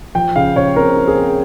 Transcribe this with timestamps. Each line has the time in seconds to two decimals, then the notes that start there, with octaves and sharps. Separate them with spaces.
0.15 F3 G5
0.36 C#3 F5
0.56 C#3 C#5
0.76 C4 A#4
0.97 C4
1.08 G#4
1.17 C4